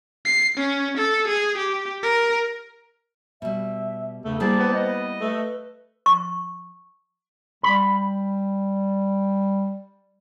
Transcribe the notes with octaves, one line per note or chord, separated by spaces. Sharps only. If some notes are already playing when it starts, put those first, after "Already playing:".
C7
C#4
A4
G#4
G4
A#4
B2 G3 E5
E2 G2 C#3 A3
G3 A#3 E4 G#4 C5 D5 G5 A5
B3
B3 D#5
A3 B4
C#6
G3 B5